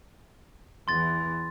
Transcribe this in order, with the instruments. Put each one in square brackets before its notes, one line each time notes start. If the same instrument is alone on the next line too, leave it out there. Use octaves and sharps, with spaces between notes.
[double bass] E2 E3 [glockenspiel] C6 A6